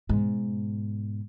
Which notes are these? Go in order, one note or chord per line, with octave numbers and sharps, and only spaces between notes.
G#2 B2